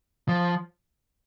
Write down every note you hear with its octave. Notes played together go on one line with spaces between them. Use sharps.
F3